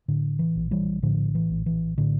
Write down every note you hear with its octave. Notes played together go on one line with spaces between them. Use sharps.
A2 D3
E3
A#1
E3 G3
A2 D3 F3
E3
A#1
E3
A2 D3